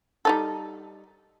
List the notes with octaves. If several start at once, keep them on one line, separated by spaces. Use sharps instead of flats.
G3 D#4 A4